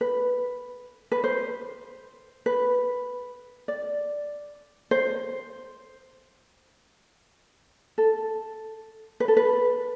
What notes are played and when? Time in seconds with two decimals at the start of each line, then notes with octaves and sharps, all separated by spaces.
0.01 B4
1.12 B4
1.24 C5
2.46 B4
3.68 D5
4.91 C5
7.98 A4
9.20 B4
9.28 A4
9.37 B4